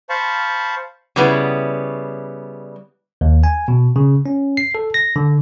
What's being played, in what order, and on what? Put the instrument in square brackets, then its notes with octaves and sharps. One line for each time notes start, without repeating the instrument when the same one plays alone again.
[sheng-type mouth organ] C5 F5 A5 B5 C#6
[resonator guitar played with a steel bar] C#3 G3 B3 E4
[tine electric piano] D#2
G#5
B2
C#3
C#4
C7
A4
A#6
D3